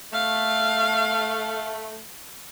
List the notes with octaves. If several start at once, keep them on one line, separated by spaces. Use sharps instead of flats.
A3 F5